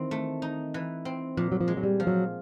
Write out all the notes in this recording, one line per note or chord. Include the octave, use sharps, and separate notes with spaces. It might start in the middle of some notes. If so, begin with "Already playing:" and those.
Already playing: D#3 E3 C4
A3
D#4
E3
C4
A#2 F3
F#3
F3
G#3
F#3
G3
F3
F#3